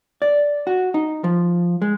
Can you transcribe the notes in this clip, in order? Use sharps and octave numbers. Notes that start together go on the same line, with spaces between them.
D5
F#4
D#4
F3
G#3